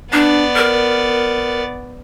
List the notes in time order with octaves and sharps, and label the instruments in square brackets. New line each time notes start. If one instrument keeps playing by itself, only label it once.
[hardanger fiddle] B3 D5 [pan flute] D4
[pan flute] A#4